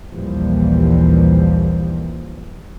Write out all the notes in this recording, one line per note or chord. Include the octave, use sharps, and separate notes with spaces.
A#1 D#2 A#2 E3 F3 G3